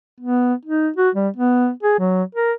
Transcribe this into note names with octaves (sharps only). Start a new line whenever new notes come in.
B3
D#4
F#4
G3
B3
G#4
F#3
A#4